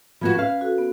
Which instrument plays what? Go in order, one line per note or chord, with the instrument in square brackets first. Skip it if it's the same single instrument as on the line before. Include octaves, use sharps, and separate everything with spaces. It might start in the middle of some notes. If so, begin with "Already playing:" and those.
[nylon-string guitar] F3 B3 F#4 [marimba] B5 G#6
[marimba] C#4 [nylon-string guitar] B4 F5
[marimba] F#4 A4
B3